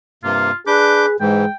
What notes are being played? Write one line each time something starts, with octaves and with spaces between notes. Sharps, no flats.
G2 C3 A#3 F4
D4 G#4 B4 D6 G6
G#2 E3 G#3 G5